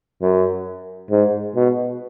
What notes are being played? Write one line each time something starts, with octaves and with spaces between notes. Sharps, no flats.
F#2
G#2
B2